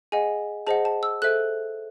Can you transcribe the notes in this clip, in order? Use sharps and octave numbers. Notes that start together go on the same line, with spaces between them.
G#4 D#5 F#5 G#5
G#4 C5 D#5 F#5 A5
A5
E6
A4 C5 E5 F#6